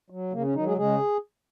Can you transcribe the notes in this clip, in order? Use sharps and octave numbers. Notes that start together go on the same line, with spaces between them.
F#3
C#3 A#3
C#4
D#3 F#3 D#4
G#3 G#4
C#3 G#3 G#4